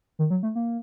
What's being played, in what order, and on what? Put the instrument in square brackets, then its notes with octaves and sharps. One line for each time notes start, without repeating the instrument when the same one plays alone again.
[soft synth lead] D#3
F#3
A3
A#3